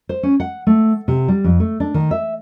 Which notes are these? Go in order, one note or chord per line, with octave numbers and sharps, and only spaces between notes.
C5
C#4
F#5
A3
C3
G3
F2
A3
D4
D#3
E5